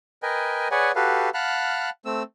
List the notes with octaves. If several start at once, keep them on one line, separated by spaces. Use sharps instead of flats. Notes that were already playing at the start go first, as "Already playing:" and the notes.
A#4 B4 D#5 G5 G#5
G#4 B4 C#5 D5 F#5 G#5
F#4 G4 A4 B4 F5
F5 F#5 A5 B5 F6 F#6
A3 C4 E6